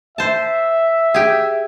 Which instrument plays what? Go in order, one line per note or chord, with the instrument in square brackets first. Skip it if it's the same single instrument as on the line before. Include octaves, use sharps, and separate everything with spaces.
[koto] C5 A5 [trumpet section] E5
[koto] G4 G#4